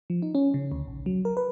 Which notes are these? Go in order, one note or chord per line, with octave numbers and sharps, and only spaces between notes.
F3
D#4
C#4
C#3
D2
A#1
F#3
A#4
B4